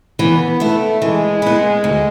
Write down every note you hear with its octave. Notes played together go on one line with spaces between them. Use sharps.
E3 B3
A3 B3 E4
E3 G#3
B3 E4
D2